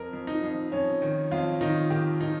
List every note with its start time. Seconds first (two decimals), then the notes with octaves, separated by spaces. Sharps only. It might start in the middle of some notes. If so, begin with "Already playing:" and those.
Already playing: F2 A#4
0.13 F2
0.27 D#4
0.43 F2
0.72 F2 C#4
1.02 D#3
1.31 F2 F4
1.61 D#3 D#4
1.90 D#3 G4
2.21 D#3 D#4